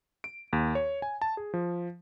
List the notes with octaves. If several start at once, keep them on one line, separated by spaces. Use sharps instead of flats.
D7
D#2
C#5
G#5
A5
G#4
F3